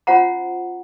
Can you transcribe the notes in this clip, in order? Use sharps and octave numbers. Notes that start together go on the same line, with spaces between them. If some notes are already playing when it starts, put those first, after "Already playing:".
C#4 F4 C5 F#5 A#5